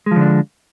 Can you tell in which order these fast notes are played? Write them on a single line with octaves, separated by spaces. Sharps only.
G#3 F3 D3 D4